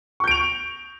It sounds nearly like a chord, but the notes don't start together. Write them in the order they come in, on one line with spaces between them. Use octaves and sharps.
C#6 G6 D7 F7